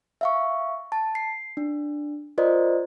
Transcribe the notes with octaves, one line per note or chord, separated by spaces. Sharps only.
E5 F5 C#6
A5
C7
D4
F4 A#4 C5 D5 D#5